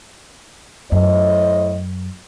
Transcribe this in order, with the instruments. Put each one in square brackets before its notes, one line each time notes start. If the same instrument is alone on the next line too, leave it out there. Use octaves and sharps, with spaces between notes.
[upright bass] F#2 [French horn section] A2 C5 D#5